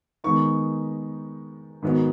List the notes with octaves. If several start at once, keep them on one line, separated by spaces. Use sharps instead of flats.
D#3 G#3 B3 D#4 C#6
G#2 D#3 F#3 B3